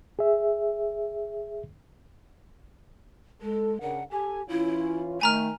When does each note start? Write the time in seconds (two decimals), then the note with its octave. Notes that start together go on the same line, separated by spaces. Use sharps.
0.19 G#4 E5
3.42 G#3 A4
3.81 C#3 D4 A#4 F#5
4.11 G4 A4 G#5
4.48 E3 C#4 E4 F4
5.21 D#3 A3 G#5 A#5 F6